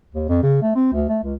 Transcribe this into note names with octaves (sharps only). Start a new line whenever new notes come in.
D#2
F2
C#3
A3
C4
D2
A3
C#2